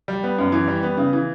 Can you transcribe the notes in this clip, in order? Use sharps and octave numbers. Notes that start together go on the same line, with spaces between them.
G3
B3
F#2
E3
G3
B3
C#3
E3